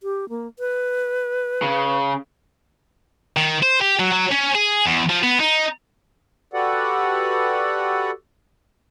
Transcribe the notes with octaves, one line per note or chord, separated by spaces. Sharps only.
G4
A#3
B4
C#3
D#3
C5
G4
F#3
F#3
C#4
G#4
E2
F3
B3
D#4
F#4 G4 A4 B4 D5 F#5